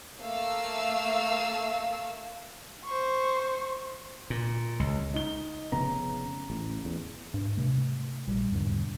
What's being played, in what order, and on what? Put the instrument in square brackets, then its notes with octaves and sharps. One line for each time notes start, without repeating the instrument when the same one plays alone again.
[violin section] A3 A#3 F5 E6
[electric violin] C5 C#6
[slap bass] A#2
C#2
[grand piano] D#4 G7
[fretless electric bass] F1 C#3 B3 [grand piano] A#5
[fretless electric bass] A1
E2
[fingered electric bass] G#2 D4
C3 A3
A#1 G3
E2 G#2 B2 D3